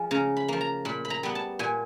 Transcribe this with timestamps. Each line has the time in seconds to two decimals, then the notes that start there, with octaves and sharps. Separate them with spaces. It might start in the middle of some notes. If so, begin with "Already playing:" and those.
Already playing: F3 G#3
0.11 C#3 A#5
0.37 B5
0.48 F3 A#3
0.61 A#5
0.85 A#2 B5
1.05 B5
1.10 A#5
1.23 G3 B3
1.35 A5
1.59 A#2 G#5